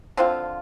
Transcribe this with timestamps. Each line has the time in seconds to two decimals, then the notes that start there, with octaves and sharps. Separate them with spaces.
0.17 D3 F3 C4 F4